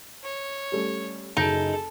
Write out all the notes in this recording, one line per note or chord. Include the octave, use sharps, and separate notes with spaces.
C#5
G3 A3 C#4
F#1 D#4 G#4 A4 D7